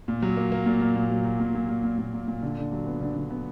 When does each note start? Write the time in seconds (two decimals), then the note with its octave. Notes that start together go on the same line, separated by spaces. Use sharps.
0.08 A#2
0.22 F#3
0.37 A#3
0.52 A#3
0.66 A#2
0.81 A#2
0.96 A#2
1.10 F#3
1.25 F#3
1.40 A#2
1.54 A#2
1.69 A#2
1.84 A#2
1.99 A#2
2.14 A#2
2.28 A#2
2.42 D3
2.57 D3
2.72 F#3
2.87 B3
3.01 D3
3.16 D3
3.31 B3